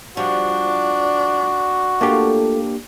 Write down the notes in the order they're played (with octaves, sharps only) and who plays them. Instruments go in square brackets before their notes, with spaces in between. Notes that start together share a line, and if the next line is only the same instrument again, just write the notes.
[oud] F3 G3 [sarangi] D4 [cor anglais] F#4
[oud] A3 F4 [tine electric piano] A#3 D4 G4